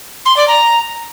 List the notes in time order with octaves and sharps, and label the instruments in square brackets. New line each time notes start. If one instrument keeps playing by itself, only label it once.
[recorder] C6
D5
A#5